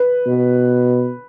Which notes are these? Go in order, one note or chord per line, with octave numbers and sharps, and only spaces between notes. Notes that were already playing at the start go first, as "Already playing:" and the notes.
Already playing: B4
B2